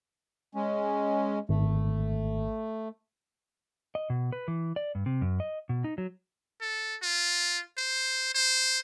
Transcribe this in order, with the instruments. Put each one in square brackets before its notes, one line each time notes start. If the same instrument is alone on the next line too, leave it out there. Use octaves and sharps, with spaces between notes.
[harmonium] G#3 C#4
[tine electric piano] G#1 [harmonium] A3
[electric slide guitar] D#5
B2
B4
E3
D5
G2
C3
F#2
D#5
B2
D#4
F#3
[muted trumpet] A4
F4
C5
C5